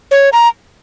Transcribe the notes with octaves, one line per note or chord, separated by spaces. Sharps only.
C#5
A#5